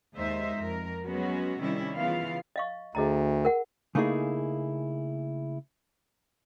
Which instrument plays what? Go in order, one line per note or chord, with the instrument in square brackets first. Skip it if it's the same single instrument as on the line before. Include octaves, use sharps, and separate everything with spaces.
[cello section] D#2 G#3 D#4 C5 E5
F2 A#4
F#3 G#3 B3 C#4 F#4
C3 D#3 G3 C#4 E4
C#3 E3 B3 E4 F4 F5
[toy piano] D#5 F5 C#6
[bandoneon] D2 [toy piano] G#4 D#5 A#5
[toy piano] A#4 F#5
[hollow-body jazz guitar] C#3 A3 A#3 D#4 E4 G#4